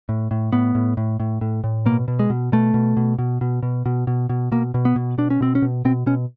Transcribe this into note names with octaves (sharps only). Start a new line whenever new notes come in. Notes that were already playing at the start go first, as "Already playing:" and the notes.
A2
A2
A2 B3
A2
A2
A2
A2
A2
B2 A#3
B2
G#3
B2
B2 A3
B2
B2
B2
B2
B2
B2
B2
B2
B2 A#3
B2
B3
B2
B2 D4
C#4
B2 C4
C#4
B2
B2 C4
B2 C#4